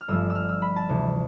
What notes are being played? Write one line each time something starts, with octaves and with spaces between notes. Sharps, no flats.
F6
G1 G2 F3 A3 E6
E6
F6
E6
B5
A5
D2 C3 E3